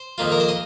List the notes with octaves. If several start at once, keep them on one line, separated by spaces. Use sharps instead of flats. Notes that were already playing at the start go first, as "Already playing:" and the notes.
Already playing: C5
F2 D#3 A#3 F4
A#4
C5
D#5